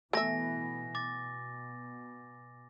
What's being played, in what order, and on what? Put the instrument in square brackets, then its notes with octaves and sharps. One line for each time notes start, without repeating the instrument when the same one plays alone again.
[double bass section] B2 E3 B3 [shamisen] A3 E5 [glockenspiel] G#5 A#6
[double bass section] B2 [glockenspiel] D6 A6